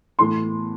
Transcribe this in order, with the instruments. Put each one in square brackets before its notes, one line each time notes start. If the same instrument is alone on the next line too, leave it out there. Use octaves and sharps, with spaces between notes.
[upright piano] A2 E3 C6